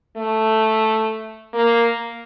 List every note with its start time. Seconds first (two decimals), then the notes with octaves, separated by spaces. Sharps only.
0.17 A3
1.54 A#3